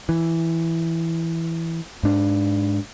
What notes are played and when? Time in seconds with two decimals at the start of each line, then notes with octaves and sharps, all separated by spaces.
0.09 E3
2.03 G#2 D4